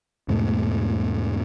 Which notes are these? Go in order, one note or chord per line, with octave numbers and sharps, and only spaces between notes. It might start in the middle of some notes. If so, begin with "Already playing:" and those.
E2 G#2 B2 A3